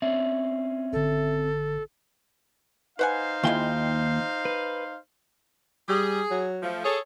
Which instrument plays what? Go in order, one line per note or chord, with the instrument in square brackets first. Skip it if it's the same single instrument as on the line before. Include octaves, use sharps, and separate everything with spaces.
[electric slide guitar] C4 C#4 D5 [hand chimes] E5
[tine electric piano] G#1 D3 [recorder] A4
[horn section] D#4 C5 F5 [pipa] B4 F#5 G#5
[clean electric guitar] D#2 G5 [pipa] G#3 E4 F4
[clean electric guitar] B4
[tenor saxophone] G3 [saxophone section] G#4
[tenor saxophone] F#3
[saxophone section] F3 A3
[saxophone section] G#4 A4 [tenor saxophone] C#5